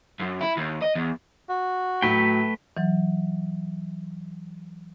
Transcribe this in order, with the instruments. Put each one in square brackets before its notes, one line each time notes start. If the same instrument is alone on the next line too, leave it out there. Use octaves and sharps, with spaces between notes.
[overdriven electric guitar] F#2
E4
D#2
D#5
E2
[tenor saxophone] F#4
[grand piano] A2 F#3 [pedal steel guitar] A3 B4 G5
[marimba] E3 F#3